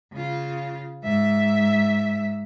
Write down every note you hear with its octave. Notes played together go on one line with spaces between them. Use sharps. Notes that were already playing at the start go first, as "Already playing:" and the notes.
C#3 F4
G#2 E5